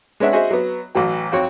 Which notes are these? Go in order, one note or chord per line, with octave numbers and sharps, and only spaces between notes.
G#3 B3 C#4 D4 E5 F#5
F#4 G#4 C5 D#5 E5
F#3 B3
A1 E3 F#3 G5
F2 C4 F#4 C#5